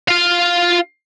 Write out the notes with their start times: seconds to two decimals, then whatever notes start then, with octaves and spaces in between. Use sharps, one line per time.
0.08 F4 F5